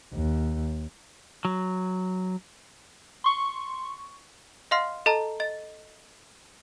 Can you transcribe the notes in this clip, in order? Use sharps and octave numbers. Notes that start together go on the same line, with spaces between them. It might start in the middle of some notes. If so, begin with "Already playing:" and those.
D#2
F#3
C6 C#6
D#5 F5 F#5 C6 F6 C7
A4 D#5 A5 A#5
D#5 A6